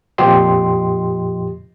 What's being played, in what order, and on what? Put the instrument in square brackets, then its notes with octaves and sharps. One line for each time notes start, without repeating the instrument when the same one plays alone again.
[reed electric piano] F2 A#2 F3 G4 D#5 C6